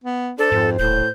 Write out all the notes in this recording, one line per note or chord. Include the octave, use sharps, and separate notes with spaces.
B3
D4 A4 C5
F2 G#2
D#1 A2 G6